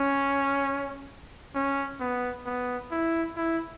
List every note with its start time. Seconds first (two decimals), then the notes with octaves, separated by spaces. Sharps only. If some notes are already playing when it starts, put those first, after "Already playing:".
Already playing: C#4
1.54 C#4
2.00 B3
2.46 B3
2.91 E4
3.36 E4